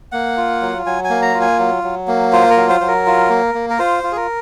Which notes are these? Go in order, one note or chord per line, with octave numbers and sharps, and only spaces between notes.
A#3 F#5
F4
F#3
F#3 G#5
G#5
A#3
A#5
F4
G#5
F#3
F#3
A#3
F4 C5
A#4
F#3
C5
F#3 C5
A#4
F4
A#3
A#3
A#4
F4 C5
F4
G#4
A#4